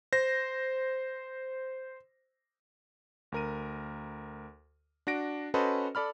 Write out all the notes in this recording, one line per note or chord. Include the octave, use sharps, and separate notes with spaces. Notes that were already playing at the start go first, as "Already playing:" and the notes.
C5 A#6
D2 A#4 D#7
D4 F#4 A#6 D7
C#4 F#4 A4 B4 C5 D#5
A4 D5 B5 F6